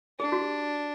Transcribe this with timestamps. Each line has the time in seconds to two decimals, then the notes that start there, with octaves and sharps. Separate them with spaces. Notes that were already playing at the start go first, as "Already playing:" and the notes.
0.19 D4 G#4
0.32 F#4
0.41 G4